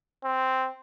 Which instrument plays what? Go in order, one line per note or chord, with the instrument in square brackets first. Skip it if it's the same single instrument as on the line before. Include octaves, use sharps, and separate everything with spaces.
[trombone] C4